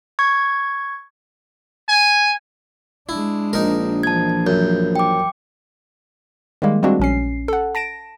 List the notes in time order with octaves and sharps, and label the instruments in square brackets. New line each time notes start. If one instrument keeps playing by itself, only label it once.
[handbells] C#6 G#6
[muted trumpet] G#5
[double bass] G#3 D4 [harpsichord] E4
[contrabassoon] A#1 [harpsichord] D#4 A#4
[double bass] E3 F3 [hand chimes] A5 G#6
[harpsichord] F#2 [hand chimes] G6
[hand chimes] G5 D6
[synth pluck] D#3 G3 G#3 A#3
G3 G#3 A#3 C4 D4 F#4
A#1 C#4 C7
A4 F#5
A5 A#6 D7 E7